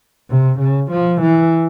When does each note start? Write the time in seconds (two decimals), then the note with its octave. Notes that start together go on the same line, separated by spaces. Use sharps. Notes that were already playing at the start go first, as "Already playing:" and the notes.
0.29 C3
0.59 C#3
0.91 F3
1.21 E3